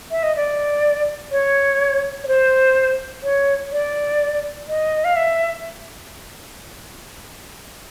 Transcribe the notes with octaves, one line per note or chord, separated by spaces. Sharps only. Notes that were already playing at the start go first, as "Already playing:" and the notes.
E5
D#5
D5
C#5
C#5
C5
C#5
D5
D#5
F5
E5